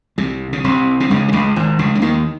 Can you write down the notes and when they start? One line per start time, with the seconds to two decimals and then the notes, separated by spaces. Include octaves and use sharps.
0.18 C2 C3
0.53 C#3
0.64 C2 C3
1.00 C3
1.10 C#2 C#3
1.28 C3
1.33 C#2 C#3
1.56 G#1 G#2
1.79 C#2 C#3
1.95 C#3
2.02 D#2 D#3